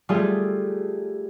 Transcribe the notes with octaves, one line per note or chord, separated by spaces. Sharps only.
G3 A3 F4 G#4